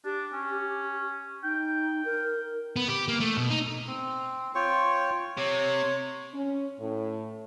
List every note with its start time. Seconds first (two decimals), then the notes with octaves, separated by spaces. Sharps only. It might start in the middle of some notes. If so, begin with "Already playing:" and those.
0.05 D4 G4
0.33 C#4
1.44 D#4 G5
2.05 A#4
2.76 B3
2.88 G4
3.08 A#3
3.20 A3
3.37 B2
3.50 D#4
3.87 C4
4.55 F4 C#5 G5 C#6
5.38 C3 C#5
6.34 C#4
6.79 A2